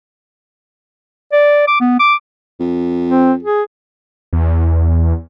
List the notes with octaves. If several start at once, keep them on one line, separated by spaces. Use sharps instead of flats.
D5
D6
B3
D6
F2
C4
G#4
E2